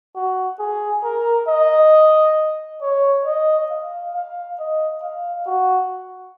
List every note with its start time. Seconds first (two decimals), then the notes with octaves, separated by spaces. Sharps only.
0.16 F#4
0.59 G#4
1.04 A#4
1.48 D#5
2.82 C#5
3.25 D#5
3.70 F5
4.14 F5
4.59 D#5
5.02 F5
5.47 F#4